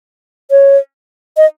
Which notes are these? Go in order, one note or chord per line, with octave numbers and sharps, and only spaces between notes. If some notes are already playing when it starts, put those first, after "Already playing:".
C#5
D#5